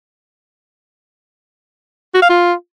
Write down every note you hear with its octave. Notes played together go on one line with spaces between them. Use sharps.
F#4
F5
F4